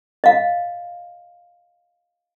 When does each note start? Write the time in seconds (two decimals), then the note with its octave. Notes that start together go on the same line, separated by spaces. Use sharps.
0.24 D#5 F5